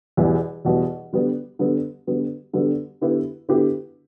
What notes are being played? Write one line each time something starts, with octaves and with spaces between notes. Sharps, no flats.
E2 B2 G3 B3 E4
E2 B2 G3 B3 E4
D3 G3 B3
D3 G3 B3
D3 G3 B3
D3 G3 B3
D3 B3 E4 G4 B4
D3 B3 E4 G4 B4